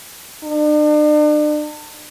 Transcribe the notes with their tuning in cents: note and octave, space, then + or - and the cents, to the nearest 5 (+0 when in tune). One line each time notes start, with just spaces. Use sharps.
D4 +40